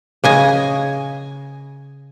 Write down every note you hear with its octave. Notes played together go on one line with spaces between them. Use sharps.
C#3 D#5 G#5